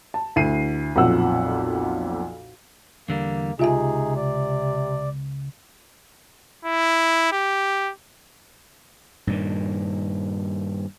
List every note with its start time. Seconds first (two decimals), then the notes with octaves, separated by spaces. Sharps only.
0.14 A5
0.36 D2 E4 C7 D#7
0.96 B1 F2 A#2 C4 F#5 E6
3.09 E2 D3 G3 A#3
3.59 C#2 C3 D#4 F4 G#4 E5 G#5
4.16 D5
6.65 E4
7.33 G4
9.27 G2 A#2 D#3